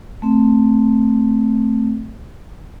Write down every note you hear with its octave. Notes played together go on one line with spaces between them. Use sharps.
A3 C4